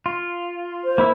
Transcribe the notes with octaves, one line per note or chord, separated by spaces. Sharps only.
F4
C5
A#3 E4 E5